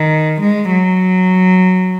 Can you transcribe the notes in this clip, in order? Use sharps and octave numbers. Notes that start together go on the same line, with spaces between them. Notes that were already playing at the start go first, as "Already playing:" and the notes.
Already playing: D#3
G#3
F#3